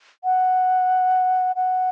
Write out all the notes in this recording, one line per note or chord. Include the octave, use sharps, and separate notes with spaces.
F#5
F#5